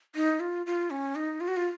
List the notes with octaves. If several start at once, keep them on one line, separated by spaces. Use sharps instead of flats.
D#4
F4
F4
C#4
D#4
F4
F#4
F4